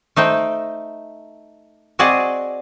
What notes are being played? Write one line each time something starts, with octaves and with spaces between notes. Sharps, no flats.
A3 D#4 C5 G5
C4 F#4 G#4 D5 D#5